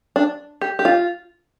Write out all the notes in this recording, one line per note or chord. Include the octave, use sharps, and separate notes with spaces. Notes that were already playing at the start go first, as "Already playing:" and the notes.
D4
G4
G4
F4